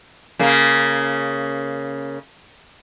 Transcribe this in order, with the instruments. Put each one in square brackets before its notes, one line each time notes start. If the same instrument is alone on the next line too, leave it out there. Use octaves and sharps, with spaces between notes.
[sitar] C#3 A#3